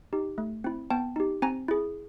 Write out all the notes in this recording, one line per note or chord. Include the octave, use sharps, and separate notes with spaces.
D#4 G4
A3
C4 E4
B3 G5 A5
D#4 G4
C4 G#5 A#5
E4 G#4